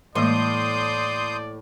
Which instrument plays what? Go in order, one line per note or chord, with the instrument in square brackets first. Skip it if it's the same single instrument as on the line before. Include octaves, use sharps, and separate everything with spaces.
[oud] A2 [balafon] E3 G#3 A#3 [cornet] D5 [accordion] C6 D#6 G6